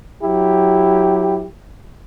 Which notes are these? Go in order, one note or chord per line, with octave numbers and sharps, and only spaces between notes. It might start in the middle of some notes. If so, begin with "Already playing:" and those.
F#3 E4 G4